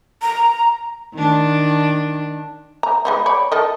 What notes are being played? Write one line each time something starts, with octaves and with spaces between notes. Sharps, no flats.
A#5
D#3 D4
A#5
G#3 B3 D#4
C#5 D5 B5
A4 A#4 D#5